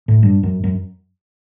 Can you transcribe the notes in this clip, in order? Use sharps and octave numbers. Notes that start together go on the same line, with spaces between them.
A2
G2
F#2
F#2